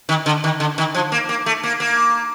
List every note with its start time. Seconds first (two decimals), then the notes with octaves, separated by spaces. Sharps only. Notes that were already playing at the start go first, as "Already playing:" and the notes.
0.09 D#3
0.26 D3
0.44 D#3
0.60 D3
0.78 D#3
0.95 F3
1.12 A#3
1.29 A#3
1.46 A3
1.63 A#3
1.80 A#3